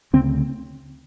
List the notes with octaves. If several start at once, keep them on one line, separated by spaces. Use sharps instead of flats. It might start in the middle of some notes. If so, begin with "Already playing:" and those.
D2 C#3 C4